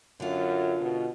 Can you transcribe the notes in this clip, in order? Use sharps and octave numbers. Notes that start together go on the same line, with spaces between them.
F#2 D3 F4
B2